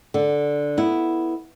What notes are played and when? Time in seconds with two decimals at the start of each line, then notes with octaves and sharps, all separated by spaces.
0.14 D3
0.77 B3 E4